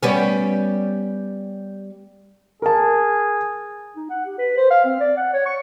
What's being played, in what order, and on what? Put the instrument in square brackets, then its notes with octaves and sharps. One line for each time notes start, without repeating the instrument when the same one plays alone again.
[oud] G3 B3 C#4
[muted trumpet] G#4 [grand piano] A#4 A5
[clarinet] D#4
F#5
G4
B4
C5
F5
C4
D5
F#5
C#5
C#6